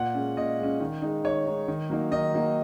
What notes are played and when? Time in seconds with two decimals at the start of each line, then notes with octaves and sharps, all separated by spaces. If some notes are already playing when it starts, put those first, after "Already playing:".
Already playing: A#2 F#5
0.14 G#3 C#4
0.37 A#2 D#5
0.59 G#3 C#4
0.80 D#3
1.02 G#3 D#4
1.24 D#3 C#5
1.47 G#3 D#4
1.68 D#3
1.90 F#3 A#3 D#4
2.11 D#3 D#5
2.34 F#3 A#3 D#4